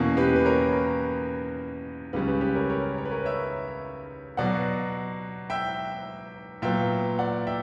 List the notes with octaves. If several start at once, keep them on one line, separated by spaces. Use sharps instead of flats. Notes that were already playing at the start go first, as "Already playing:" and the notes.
Already playing: E2 B2 A#3 C#4
G4 B4
B4
A#4 C#5
C#2 C#3 G3 C#4 G4 B4
G4 B4
G4 B4
A#4 C#5
A#4 C#5
C#5
B4
A#4 C#5
C#5 E5
B2 F#3 B3 D5 F#5
E5 G5
A#2 F#3 B3 E5 G5
D5 F#5
E5 G5